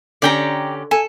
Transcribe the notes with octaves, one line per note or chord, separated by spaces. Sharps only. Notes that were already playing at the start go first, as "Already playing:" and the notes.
D3 C#4 G4 D5 G5 A#5
A4 G#5